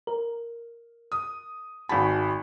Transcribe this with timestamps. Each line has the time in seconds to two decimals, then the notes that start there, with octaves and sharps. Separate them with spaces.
0.07 A#4
1.12 D#6
1.89 G#1 F#4 G#5 A5 B5